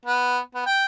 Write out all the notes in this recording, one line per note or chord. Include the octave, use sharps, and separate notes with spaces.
B3
B3
G5